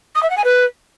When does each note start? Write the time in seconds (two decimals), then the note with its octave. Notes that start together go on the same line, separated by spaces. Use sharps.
0.15 D#6
0.22 E5
0.30 F#5
0.37 G#5
0.44 B4